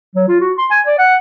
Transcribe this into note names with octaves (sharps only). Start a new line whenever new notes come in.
F#3
F4
F#4
C6
G#5
D5
F#5